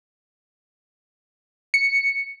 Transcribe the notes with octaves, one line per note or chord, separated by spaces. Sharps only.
C#7